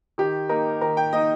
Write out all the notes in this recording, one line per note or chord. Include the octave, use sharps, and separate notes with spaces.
D#3 G4
A#3 D#4 A#4
D#3 A#4
G5
A#3 D#4 D#5